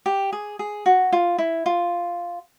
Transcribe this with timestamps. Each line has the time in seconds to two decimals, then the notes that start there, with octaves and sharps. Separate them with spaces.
0.06 G4
0.33 G#4
0.59 G#4
0.86 F#4
1.12 F4
1.38 E4
1.66 F4